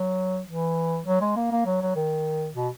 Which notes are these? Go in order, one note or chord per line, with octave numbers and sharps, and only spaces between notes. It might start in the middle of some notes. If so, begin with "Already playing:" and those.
Already playing: F#3
E3
F#3
G#3
A#3
A#3
F#3
F#3
D#3
B2